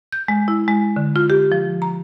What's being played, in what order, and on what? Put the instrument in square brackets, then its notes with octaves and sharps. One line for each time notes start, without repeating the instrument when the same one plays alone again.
[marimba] G6
G#3
E4
G#3
D3
F4
G4
F3
A#5